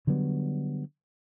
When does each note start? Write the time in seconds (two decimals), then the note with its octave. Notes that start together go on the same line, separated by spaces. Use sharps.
0.07 D3 F#3 G3 B3